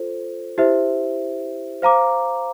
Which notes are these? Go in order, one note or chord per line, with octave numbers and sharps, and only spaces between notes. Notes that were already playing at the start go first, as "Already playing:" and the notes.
Already playing: F4 A4 C5
E4 G4 C5 E5
C5 F5 A#5 D6